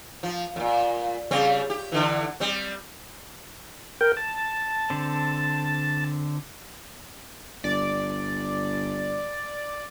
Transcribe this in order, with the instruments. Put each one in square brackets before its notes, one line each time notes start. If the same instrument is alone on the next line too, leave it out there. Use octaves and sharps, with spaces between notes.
[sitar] F3
F2 A#2
C#3 G3 C4
G4
D3 E3
G3 C4
[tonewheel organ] A#4 G5
A5
[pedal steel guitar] D3 C4
[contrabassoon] G1 [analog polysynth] D5